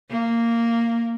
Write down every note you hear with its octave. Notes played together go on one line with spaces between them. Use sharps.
A#3